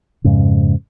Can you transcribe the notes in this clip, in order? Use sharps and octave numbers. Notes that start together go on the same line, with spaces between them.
F2 G#2 C#3